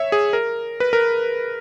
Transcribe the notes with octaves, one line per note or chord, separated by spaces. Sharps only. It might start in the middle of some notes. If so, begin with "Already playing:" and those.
Already playing: C#5 E5
G#4
A#4
B4
A#4